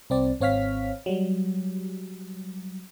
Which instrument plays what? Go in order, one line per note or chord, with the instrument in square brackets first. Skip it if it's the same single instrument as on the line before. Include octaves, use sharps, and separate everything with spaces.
[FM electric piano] C2 C4 D5
G#1 C4 C#5 F5 F6 B6
F#3 G3